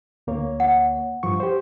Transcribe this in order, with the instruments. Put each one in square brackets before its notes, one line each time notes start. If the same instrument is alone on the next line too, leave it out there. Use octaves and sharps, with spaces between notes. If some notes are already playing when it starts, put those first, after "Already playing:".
[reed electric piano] D2 A#3 C#5
[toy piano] F#5
[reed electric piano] G2 F3 C#6
G4 C5